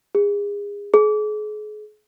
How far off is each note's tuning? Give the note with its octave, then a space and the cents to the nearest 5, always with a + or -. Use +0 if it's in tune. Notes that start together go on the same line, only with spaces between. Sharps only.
G#4 -30
G#4 +35